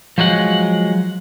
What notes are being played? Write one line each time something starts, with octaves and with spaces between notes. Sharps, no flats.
F3 F#3 G#3 F#5